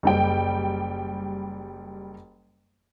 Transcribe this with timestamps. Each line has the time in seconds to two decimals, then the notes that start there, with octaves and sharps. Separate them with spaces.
0.03 F#1 G3 G5